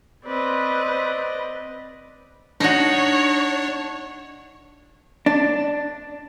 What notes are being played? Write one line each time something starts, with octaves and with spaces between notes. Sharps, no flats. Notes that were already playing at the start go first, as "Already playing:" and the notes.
C4 B4 D5 D#5
D4 D#4 F#4 C#5
D4